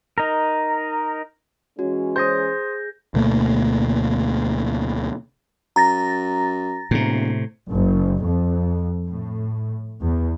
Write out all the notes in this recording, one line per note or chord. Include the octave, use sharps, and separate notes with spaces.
D#4 A#4
E3 G#3 C#4 F#4
G#4 C5 D#6 G6 G#6 A#6
D2 B2 A3 A#3
F#2 A#5 A6 A#6
E1 A2 C3
F#1
F2
A2
E2